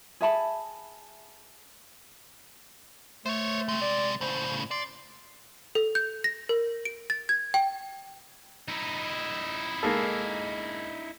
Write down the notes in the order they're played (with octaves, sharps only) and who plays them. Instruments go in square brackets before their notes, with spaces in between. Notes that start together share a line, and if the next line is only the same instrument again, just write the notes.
[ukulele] G#4 E5 A5 B5
[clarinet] A3 [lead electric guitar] C5 C#5
[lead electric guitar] C3 G#3
[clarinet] D5
[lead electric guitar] A2 C#3 [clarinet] C5
[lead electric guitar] D5 [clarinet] C6
[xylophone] A4
G6
A#6
A#4
D7
A6
G#6
G5
[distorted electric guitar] D#4 E4
[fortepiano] G#3 A#3 A4